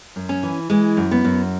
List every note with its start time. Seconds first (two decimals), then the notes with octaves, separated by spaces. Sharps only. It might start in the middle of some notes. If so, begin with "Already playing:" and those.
0.16 F#2
0.29 C#4
0.43 E3
0.70 E3 G#3
0.97 F#2
1.11 B3
1.24 F#2